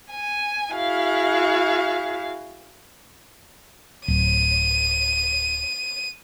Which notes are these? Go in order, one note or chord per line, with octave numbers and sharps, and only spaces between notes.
G#5
E4 F#4 G#4 F5
D1 D#7